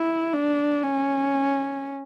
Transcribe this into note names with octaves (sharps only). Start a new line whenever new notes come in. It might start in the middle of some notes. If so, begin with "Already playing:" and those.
Already playing: E4
D4
C#4